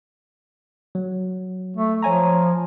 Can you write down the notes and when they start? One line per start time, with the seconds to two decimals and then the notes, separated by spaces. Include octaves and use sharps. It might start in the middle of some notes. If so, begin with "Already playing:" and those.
0.95 F#3
1.77 A3
2.03 F3 C#5 G#5 A#5